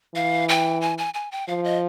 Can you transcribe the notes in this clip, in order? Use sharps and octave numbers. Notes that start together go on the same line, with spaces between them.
E3 F5
G5
G#5
G#5
G#5
G5
F3 F5
D#5